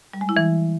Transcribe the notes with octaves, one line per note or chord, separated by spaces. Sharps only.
G3
G#3
E4
E3